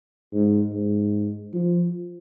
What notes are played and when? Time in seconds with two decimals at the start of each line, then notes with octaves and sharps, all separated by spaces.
0.33 G#2
0.73 G#2
1.53 F3